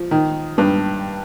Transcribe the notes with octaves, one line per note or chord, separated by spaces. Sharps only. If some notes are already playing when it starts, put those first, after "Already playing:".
Already playing: F3
D#3
G2